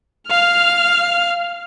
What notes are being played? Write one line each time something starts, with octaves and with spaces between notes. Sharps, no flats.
F5 F6